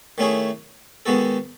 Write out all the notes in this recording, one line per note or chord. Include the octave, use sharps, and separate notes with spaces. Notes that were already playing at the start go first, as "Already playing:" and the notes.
D#3 A3 C#4 E4 G#4
D#3 G#3 B3 F#4 A4